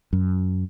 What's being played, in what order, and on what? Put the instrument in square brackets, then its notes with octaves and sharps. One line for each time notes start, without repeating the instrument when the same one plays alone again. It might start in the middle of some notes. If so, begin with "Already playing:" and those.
[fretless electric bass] F#2